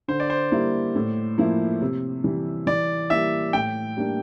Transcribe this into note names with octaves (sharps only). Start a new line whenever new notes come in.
D3 C5
D5
C5
G3 A#3 E4
A2
F3 A#3 E4
C3
E3 G3
E3 D5
G3 A#3 E4 E5
A2 G5
G3 A#3 D4